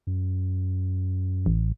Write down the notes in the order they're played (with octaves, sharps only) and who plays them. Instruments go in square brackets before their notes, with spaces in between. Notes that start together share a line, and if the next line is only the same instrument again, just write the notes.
[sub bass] F#2
[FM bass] A1